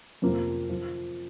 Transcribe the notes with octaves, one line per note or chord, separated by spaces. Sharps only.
F2 C3 F3 A#3
F3